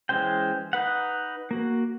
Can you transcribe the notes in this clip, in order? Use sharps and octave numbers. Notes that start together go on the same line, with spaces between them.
E3 G#3 C#4 C5 G5
D#4 B4 F#5
A#3 F#4